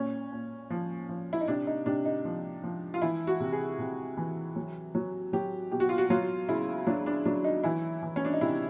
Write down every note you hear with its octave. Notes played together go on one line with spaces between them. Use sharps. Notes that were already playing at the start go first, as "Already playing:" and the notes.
Already playing: A#2 C#4
A#2
F3
F3
E4
D#4
C3 D4
D#4
C3 D4
D#4
F3
F3
F4
E3 E4
F#4
C3
G#4
C3
E3
F#3
F#3
F#3 G4
B2 G4
F#4
F4
F#4
F#3 F4
C#3 E4
F#3 D4
D4
F#3 D4
D#4
E3 E4
E3
C#4
D4
D#4
C3 E4